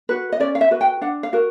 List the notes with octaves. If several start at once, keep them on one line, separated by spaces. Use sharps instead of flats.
F#4 B4
D#5
C#4 D5
F5
E5
F#4 B4
G5
D4 F#5
F5
F#4 A#4